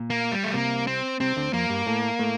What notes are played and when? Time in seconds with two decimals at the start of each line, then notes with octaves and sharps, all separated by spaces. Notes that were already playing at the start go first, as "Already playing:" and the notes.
Already playing: A#2
0.10 A#3
0.32 G3
0.43 A3
0.54 C2 C3 A#3
0.87 C4
1.20 C2 C3 C4
1.36 D2 D3
1.53 F2 F3 A#3
1.70 G2 G3
1.86 A2 A3
2.19 A2 A3